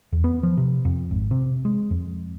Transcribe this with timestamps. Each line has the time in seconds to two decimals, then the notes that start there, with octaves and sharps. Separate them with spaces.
0.12 E2
0.24 B3
0.43 F3
0.57 C3
0.85 F2
1.11 G#1
1.31 C3
1.65 G#3
1.91 F2